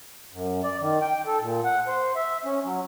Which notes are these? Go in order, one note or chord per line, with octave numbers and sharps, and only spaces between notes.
F#2
D5
D#3
G5
A4
A#2
F#5
C5
E5
C#4
F#3